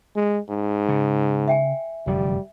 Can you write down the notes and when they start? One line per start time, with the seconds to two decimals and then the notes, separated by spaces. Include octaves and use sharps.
0.16 G#3
0.49 G#2
0.89 C#3
1.48 E5 G5 G#5
2.07 F1 F#2 D3 G3